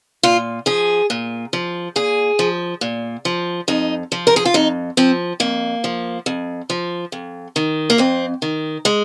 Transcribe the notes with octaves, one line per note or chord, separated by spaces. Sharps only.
A#2 F4
F3 G#4
A#2
F3
A#2 G#4
F3
A#2
F3
F2 D#4
F3
A#4
G#4
F4
F2 D#4
F3 C4
F2 A#3
F3
F2
F3
F2
D#3
A#3
F2 C4
D#3
G#3